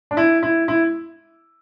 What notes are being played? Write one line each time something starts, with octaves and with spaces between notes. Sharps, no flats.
D4
E4
E4
E4